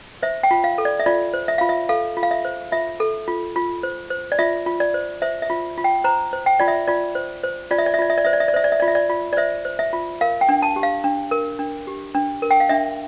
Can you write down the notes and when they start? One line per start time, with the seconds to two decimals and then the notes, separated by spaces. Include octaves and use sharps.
0.23 C5 E5
0.43 G5
0.51 F4
0.64 F5
0.78 A4
0.85 D5
1.00 E5
1.06 F4 D5
1.34 C5
1.48 E5
1.58 F4 F5
1.69 E5
1.89 A4 F5
2.17 F4
2.23 F5
2.31 E5
2.45 C5
2.72 F4 E5
3.00 A4
3.28 F4
3.56 F4
3.83 C5
4.10 C5
4.32 D5
4.39 F4 E5
4.66 F4
4.80 D5
4.94 C5
5.22 C5 E5
5.42 E5
5.50 F4
5.78 F4
5.84 G5
6.04 C5 A#5
6.33 C5
6.46 G5
6.60 F4 D5
6.68 E5
6.88 F4 D5
7.15 C5
7.44 C5
7.71 F4 D5
7.78 E5
7.86 D5
7.94 E5
7.99 F4 D5
8.10 E5
8.18 D5
8.25 C5 E5
8.33 D5
8.40 E5
8.48 D5
8.54 C5 E5
8.64 D5
8.72 E5
8.80 F4 D5
8.88 E5
8.95 D5
9.10 F4
9.33 D5
9.37 C5 E5
9.65 C5
9.79 E5
9.93 F4
10.21 A#4 F5
10.41 G5
10.49 D4
10.62 A5
10.76 G4
10.83 F5
11.04 D4
11.31 A#4
11.59 D4
11.87 G4
12.15 D4
12.42 A#4
12.51 G5
12.60 F5
12.69 D4 E5